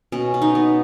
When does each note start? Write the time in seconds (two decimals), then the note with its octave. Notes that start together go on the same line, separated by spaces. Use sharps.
0.12 B2 C#4
0.34 B2
0.42 D#4
0.55 B3